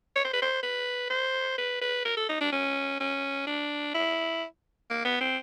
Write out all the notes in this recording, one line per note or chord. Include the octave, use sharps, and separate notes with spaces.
C#5
C5
B4
C5
B4
C5
B4
B4
A#4
A4
D#4
D4
C#4
C#4
D4
E4
A#3
B3
C4